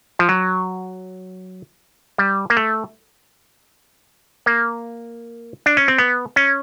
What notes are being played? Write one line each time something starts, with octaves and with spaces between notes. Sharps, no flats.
F3
F#3
G3
A#3
A3
A#3
D4
C#4
C4
B3
C#4